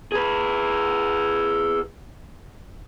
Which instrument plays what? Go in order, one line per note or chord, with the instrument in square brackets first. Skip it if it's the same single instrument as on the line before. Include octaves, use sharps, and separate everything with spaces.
[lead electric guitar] G#4 B4